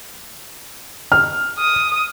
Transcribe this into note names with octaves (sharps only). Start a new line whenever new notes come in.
F6
D#6